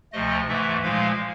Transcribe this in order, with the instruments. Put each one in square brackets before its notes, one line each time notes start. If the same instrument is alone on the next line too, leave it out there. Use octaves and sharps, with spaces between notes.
[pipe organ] D2 C3 F3 A3 D#5
G#2 E3 A3 E5
A#2 F3 G#3 F5